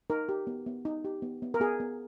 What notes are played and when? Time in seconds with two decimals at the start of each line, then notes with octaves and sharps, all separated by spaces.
0.10 D#4 A#4
0.29 G4
0.47 B3
0.66 B3
0.85 D#4
1.05 G4
1.22 B3
1.42 B3
1.54 A#4
1.60 B3 G#4
1.80 B3